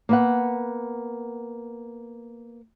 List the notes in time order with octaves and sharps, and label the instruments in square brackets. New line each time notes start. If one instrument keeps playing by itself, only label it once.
[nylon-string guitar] A#3 B3 F#5